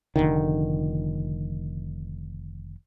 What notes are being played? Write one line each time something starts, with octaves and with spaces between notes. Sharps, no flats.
F1 C2 D3 D#3